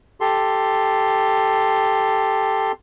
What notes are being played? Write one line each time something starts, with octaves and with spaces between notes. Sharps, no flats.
G4 A4 C6